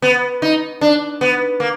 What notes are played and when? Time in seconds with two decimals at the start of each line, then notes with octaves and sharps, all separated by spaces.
0.02 B3
0.42 D#4
0.81 D4
1.21 B3
1.60 A#3